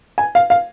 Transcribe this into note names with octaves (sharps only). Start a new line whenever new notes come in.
G#5
F5
F5